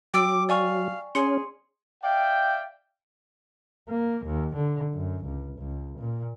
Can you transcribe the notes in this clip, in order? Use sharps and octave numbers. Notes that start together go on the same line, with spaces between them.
F#3 G5 D6 E6 D7
D5 F5 G#5 C#6
C#4 G#4 C6 C#7
D5 E5 F5 G5
A#3
D#2
D3
F#2
C#2
C#2
A#2